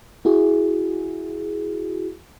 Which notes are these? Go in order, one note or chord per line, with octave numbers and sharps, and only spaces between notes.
E4 F#4 G#4